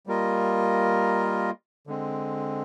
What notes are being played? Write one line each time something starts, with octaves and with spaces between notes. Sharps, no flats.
G3 A#3 F4 A#4 D#5
D3 G#3 C4